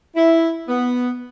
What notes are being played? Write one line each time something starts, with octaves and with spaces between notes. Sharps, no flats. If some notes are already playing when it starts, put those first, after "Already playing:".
E4
B3